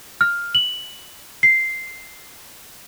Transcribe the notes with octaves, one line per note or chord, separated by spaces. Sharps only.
F6
F#7
C7